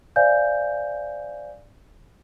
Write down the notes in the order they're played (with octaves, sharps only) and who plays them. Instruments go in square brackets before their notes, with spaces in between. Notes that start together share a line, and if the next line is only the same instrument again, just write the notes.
[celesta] C5 D5 E5 F5 G#5 G6